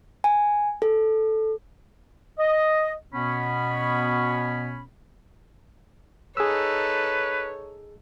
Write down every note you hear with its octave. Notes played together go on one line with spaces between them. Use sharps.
G#5
A4
D#5
B2 B3 C#4 B5
D#4 G#4 A4 B4 C#5 E6